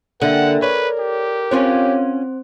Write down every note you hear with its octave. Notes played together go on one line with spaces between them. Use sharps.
D3 G3 A#3 D4 A#4 E5 F#5
B4 C#5 D5
G4
C4 C#4 F4 C5 C#5